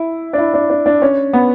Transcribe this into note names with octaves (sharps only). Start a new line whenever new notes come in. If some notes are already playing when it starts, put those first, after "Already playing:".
Already playing: E4
D4
E4
D4
D4
D4
C#4
B3